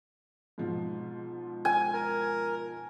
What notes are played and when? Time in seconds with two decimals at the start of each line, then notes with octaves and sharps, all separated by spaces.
0.58 G#2 B2 F3
1.65 G#5
1.93 A#4